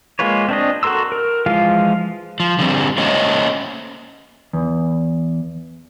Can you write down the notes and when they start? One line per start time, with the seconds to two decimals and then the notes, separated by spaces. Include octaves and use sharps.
0.19 G#3 A#3 F4 B4 C#5
0.48 C4 D4 D#5
0.83 F#4 A4 A#4 C6 E6
1.12 A#4
1.46 E3 F3 G#3 F4 F5
2.40 F3
2.59 D3 G3 C4
2.98 A3 A#3 C#4 C5 C#5 D#5
4.53 E2